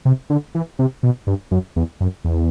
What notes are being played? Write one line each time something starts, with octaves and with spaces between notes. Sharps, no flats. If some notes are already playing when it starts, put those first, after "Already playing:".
C3
D3
E3
C3
B2
G2
F#2
E2
F#2
E2